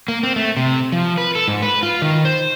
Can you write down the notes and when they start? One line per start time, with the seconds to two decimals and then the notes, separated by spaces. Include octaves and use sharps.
0.08 A#3
0.23 C4
0.36 A3
0.57 C3
0.92 F3
1.18 B4
1.35 A4
1.48 G#2
1.62 B4
1.83 F4
2.02 D#3
2.25 C5